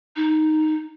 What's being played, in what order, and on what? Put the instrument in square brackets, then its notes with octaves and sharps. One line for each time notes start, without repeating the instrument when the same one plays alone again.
[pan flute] D#4